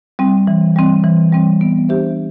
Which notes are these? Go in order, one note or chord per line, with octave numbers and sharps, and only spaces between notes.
G3 C4
E3
G3 C4
E3
G3 C4
B3
D4 G4 C5 E5